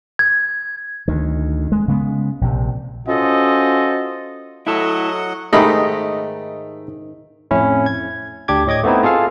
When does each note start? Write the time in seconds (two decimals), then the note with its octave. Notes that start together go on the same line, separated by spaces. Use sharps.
0.19 G#6
1.08 D2 D#3
1.72 G#3
1.88 C#3 G#3 B3
2.41 A#1 C3
3.07 C#4 F4 F#4 A4 C5 D#5
4.67 F#3 E4 A4 D#5 F#5
5.53 G#2 D#3 G#3 A3 D#4 G4 D#5 B5
7.51 F2 A2 C#4 E4
7.86 G#6
8.48 D2 D4 G4 D6 G#6
8.66 A2 C#5 D#5 D6 G#6
8.84 A3 B3 C4 D#4 E4
9.03 F4 G#4 A4 F5